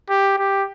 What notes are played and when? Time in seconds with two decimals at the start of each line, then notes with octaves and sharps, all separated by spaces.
0.09 G4
0.38 G4